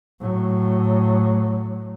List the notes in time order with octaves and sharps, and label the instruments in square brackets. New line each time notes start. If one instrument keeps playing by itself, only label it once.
[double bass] A2 F#3